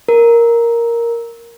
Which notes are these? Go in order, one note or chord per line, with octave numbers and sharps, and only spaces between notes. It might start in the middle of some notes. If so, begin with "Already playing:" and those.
A#4